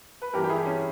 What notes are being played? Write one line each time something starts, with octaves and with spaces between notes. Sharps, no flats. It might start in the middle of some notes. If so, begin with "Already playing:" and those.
B4
G2 E3 G3 G4 A#4
G4
E4 G#4
C#4